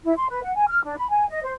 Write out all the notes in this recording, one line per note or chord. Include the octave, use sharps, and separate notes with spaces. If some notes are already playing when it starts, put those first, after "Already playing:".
E4
C6
B4
F#5
G#5
F6
D4
B5
G#5
D#5
C5